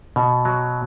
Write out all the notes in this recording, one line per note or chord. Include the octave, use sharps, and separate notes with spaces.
B2
F#3